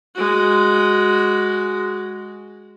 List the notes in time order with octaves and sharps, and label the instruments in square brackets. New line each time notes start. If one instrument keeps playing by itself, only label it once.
[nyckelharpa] G#3 F#4